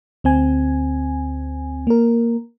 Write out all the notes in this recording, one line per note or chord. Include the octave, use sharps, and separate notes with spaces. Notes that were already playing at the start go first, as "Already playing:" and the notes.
D2 C4 G#5
A#3 A#4